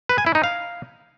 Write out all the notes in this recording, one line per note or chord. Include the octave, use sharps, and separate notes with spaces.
B4
G#5
E4
D#4
F5